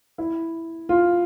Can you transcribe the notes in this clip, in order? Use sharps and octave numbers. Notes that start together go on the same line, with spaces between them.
E4
F4